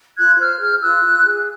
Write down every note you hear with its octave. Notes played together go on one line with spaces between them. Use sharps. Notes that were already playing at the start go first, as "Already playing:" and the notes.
F4 F#6 G#6
C5 F6 G6
G#4 F6 G6
F4 E6 F#6
F4
G#4